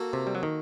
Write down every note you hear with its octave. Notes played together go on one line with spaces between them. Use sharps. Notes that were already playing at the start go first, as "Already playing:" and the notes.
Already playing: A#3 F#4 A4
C3
G3
F#3
D#3